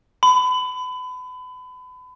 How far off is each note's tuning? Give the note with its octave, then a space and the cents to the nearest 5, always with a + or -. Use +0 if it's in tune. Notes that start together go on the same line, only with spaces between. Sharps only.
B5 +35